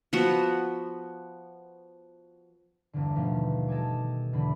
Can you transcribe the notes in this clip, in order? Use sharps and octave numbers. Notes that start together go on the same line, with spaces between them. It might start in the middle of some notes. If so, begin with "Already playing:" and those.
F3 B3 F#4
G1 E2 D3
D#2 B2 F3 A3
G4 A4 D#5 G#5 D6
E2 D3 A3 B5